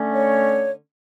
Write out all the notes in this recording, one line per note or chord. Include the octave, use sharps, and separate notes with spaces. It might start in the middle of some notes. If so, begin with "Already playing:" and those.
Already playing: D3 A3 C#4
C#5